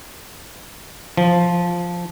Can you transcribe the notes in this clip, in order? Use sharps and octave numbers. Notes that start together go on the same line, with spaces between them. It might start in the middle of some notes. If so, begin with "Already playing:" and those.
F3